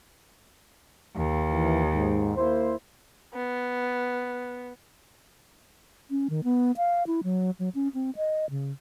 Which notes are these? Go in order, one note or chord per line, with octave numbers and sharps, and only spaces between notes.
D#2
E3
G#2
A#3 E4 C5
B3
C#4
D#3
B3
F5
E4
F#3
F#3
C#4
C4
D#5
C#3